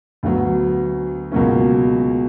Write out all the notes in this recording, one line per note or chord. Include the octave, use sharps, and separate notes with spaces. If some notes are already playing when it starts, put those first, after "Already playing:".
D2 D3 F#3 B3
C#2 B2 F#3 A#3 C#4